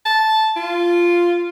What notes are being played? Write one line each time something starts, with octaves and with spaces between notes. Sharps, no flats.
A5
F4